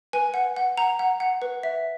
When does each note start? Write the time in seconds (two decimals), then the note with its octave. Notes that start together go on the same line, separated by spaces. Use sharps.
0.13 B4 G#5
0.34 F#5
0.56 F#5
0.78 F#5 A#5
0.99 F#5
1.20 F#5
1.42 B4
1.63 E5